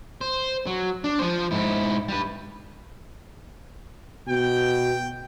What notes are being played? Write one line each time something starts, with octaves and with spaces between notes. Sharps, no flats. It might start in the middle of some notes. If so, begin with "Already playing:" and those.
C5
F#3
D4
F3 C5
G#2 E4
G3 B4
B2 G5